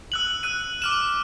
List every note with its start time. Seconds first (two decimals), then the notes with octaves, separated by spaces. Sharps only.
0.12 E6 F#6 F#7
0.43 E6 F#6 D#7
0.82 D6 F6 E7